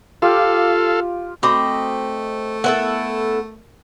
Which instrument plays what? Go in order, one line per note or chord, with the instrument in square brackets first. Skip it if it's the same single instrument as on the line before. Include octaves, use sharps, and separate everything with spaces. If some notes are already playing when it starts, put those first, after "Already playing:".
[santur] F4 G4 [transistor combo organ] A4 F5
[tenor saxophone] A3 [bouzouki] C4 D#5 [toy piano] F#4 B5 D6
[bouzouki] B3 E4 A4 [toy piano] A#4